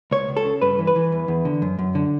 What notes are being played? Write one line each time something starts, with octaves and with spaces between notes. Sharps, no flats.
C#2 C#5
C#2
A4
C#3
G2 B4
E3
B4
E3
E2
E2
D3
F#2
F#2
D3